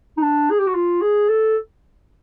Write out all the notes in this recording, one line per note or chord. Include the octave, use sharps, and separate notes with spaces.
D#4
D4
G#4
G4
F#4
F4
G#4
A4